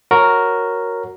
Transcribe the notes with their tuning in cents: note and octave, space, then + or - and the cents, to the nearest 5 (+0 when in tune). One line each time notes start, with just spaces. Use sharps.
F#4 +0 A#4 +0 C#5 +0